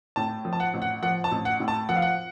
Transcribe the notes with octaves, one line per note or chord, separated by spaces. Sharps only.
A2 A5
F3
A5
F#5
A1
F#5
F3 F#5
A5
A1
F#5
A2
A5
F3 F#5
F5
F#5